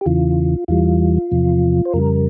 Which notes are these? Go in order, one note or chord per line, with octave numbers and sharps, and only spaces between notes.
G4
E2 C#3 E3 F4
E2 E3 G3 F4
E2 C3 F3
C5
F2 C#3 G3 A#4